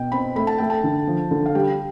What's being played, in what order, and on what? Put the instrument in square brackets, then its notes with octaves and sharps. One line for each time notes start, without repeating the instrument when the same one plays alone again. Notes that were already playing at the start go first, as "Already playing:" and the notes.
Already playing: [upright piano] B2 [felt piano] G5
[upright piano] C4 [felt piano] B5
[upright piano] A3 [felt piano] B5
[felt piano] A5
[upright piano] A3 [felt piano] G5
[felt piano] A5
[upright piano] D3
F3
D3
[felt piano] F5
[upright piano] G3 [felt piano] G5